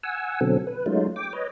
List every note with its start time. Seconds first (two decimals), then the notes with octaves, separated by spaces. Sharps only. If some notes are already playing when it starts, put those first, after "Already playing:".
0.03 F#5 G#5 E6
0.41 B2 D3 F#3 C4 A4
0.67 B4
0.86 F#3 G#3 A3 C#4 D#4 F4
1.16 G5 D6
1.33 B4 C#5 D#5